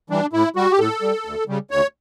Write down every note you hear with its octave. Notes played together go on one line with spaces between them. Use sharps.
E3 G3 D4
A2 E4
G3 F#4
G4
A2 A4
G3
D2
C#3 G3
D2 C#5